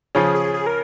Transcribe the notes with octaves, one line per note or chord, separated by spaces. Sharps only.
C#3 F3 C#4 G#4
G#4
G#4
A#4